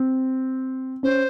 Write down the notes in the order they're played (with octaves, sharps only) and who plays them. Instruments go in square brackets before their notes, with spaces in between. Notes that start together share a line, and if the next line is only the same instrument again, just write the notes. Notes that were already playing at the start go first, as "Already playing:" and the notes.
Already playing: [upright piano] C4
[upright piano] C#4 [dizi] C5